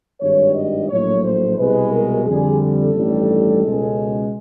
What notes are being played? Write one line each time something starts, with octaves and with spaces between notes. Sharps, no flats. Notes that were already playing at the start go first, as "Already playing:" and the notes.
G#1 G2 D#3 G3 C#5
D#5
A#1 A2 F#3 A3 C#5
C5
C2 B2 G#3 B4
A#4
F2 D3 G3 G#4
A4
A1 G2 D#3 G3
C#2 B2 G#3